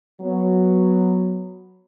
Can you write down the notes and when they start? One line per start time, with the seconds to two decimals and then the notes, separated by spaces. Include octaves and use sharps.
0.21 F#3 B3